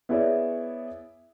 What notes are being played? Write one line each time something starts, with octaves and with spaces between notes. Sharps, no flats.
B3 E4 G#4 C#5 D5 E5